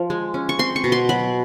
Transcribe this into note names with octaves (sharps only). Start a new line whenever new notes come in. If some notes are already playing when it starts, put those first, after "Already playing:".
Already playing: F3
G#3
C#4
C#6
C4 C6
C#6
B2
C6
F#3 B5